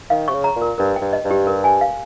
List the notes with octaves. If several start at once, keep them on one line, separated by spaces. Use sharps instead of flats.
D#3 F5
C3 C#6
C#3
A#5
A#2
A#4
G2 A#4
G5
G2
D#5
G2
G4
A#4
G#5
F5